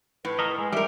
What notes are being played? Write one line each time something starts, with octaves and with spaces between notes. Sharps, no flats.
A2 B4
A4 A#4 D#5
G#3 G#5
G3 A#4 E5